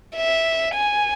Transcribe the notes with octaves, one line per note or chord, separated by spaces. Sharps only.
E5
G#5